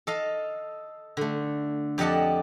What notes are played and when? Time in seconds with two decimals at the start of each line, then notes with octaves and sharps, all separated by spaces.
0.07 A4 D#5 F5
1.17 D3 A3
1.98 F2 G4 D5 D#5 F#5 A5